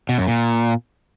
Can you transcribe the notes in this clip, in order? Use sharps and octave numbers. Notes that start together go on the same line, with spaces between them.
B2
F#2
A#2